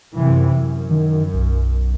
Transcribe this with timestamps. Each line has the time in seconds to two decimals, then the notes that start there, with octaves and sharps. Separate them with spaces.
0.15 F#2 C3 E3
0.54 F#2
0.91 D#3
1.34 B1